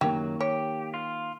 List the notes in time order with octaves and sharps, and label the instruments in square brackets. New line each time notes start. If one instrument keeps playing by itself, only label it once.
[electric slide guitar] F#2 F#3 [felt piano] D#3 A#3 [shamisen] G4
[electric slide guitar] G4 [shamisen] C#5
[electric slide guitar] F4